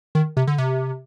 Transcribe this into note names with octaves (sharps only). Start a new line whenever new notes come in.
D#3
C3
D3
C3